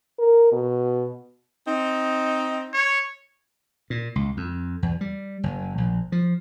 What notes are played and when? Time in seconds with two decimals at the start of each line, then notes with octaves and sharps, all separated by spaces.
0.19 A#4
0.52 B2
1.66 C4 D#4
2.73 C#5
3.90 A#2
4.16 C#2
4.37 F2
4.82 E2
5.01 G3
5.43 F#1
5.78 A#1
6.12 F3